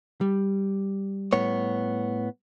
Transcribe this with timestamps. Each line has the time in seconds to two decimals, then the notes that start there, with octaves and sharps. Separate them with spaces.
0.21 G3
1.33 A2 B3 C#5